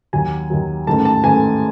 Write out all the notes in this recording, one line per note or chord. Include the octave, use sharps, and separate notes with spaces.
D#2 D#3 F#3 G#5
D#2 D#3 F#3
A1 G#2 D#3 A3 A5
A5
A1 G#2 D#3 A3 G#5